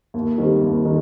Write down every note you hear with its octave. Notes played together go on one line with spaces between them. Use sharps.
D#2
D#3 G3 C4
D#2
D#3